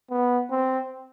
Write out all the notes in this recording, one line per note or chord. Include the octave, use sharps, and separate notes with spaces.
B3
C4